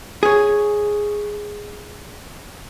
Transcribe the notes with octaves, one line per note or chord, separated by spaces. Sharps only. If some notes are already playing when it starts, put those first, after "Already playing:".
G#4 C#5